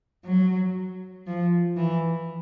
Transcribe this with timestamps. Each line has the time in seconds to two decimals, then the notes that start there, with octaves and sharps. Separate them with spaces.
0.25 F#3
1.27 F3
1.77 E3